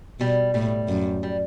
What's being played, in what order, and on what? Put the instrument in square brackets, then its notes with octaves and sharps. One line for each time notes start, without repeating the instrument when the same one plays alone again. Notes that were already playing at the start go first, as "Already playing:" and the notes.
[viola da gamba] B2 [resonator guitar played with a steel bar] G3
[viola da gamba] A2 [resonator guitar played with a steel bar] G3
[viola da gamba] F#2
[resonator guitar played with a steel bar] G3